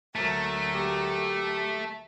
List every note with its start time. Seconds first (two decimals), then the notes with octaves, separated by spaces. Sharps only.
0.16 D2 F#3 A3 A#4
0.73 G4